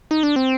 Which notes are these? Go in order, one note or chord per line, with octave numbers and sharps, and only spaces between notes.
D#4
D4
C4